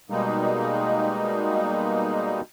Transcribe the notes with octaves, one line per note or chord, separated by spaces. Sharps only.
B2 G3 G#3 A#3 D#4